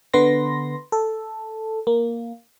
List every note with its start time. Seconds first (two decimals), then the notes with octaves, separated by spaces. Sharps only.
0.13 D3 B3 B4 C6 A#6
0.92 A4
1.87 A#3